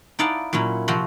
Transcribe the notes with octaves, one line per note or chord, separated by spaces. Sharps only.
D#4 E4 D5 F5 F#5 A5
A#2 F#3 C#4 E4
C3 F3 C4 F#4 F#5